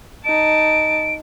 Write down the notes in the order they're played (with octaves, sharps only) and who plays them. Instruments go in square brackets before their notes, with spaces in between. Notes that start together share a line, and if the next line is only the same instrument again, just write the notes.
[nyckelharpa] D#4 A5 [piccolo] D7